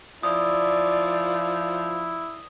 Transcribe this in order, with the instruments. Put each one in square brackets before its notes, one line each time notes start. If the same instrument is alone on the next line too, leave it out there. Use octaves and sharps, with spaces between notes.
[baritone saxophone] F3 [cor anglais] E4 [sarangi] D5 [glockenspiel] D#6